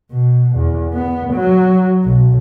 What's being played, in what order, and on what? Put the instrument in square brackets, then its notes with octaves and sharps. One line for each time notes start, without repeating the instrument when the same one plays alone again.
[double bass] B2
E2
B3
F#3
B1